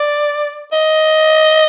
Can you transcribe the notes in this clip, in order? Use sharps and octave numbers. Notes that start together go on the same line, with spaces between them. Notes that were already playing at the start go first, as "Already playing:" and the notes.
Already playing: D5
D#5